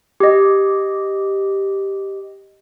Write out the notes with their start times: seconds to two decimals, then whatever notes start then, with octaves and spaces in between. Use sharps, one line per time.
0.20 G4 D#5